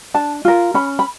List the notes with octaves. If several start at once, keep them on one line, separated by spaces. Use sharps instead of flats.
D4 A5
F4 A#4
C#4 B5
B5